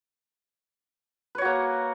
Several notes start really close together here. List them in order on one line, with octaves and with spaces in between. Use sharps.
B4 C#5 F#4 A#3